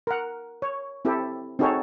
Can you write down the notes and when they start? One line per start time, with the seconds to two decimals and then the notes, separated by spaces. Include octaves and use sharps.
0.07 A#4 F#5
0.62 C#5
1.05 C4 E4 G4 A4
1.59 C4 D#4 F#4 G#4 A4 C#5